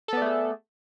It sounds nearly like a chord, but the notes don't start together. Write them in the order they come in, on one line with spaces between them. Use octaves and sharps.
A4 B3 D5 A3 G#4